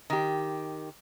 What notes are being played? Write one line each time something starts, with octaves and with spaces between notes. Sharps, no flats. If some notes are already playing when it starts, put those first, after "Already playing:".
D#3 G4